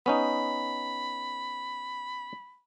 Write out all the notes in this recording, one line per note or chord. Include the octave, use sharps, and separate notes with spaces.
B3 C#4 D#4 B5